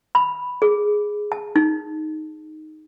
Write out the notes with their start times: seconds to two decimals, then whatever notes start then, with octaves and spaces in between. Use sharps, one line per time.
0.15 B5
0.62 G#4
1.32 A5
1.56 D#4